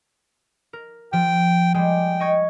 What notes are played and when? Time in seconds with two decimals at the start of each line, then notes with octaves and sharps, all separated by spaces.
0.73 A#4
1.13 F3 G5
1.74 G3 G#3 G5
2.20 D#5 C#6 G#6